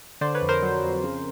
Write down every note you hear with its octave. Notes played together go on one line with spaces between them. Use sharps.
D3 C5 D5
B4 C#5
F2
A#4 C5
F#3
F2
C#3